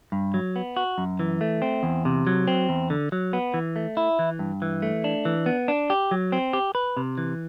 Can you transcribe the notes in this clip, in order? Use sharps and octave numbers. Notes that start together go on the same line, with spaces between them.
G2
F#3
B3
F#4
F#2
E3
A3
C4
E2
C3
F#3
C4
E2
D3
F#3
B3
E3
A3
E4
E3
G2
E3
A3
D4
E3
B3
D4
G4
F#3
C4
G4
B4
C3
E3